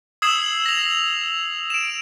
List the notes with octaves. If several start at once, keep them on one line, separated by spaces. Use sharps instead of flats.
D#6 E6 G#6 C7 E7 F#7
A#6 F7
D7 E7